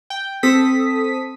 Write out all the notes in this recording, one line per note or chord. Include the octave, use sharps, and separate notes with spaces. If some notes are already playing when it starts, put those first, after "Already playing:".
G5
C4 A4 D#6 B6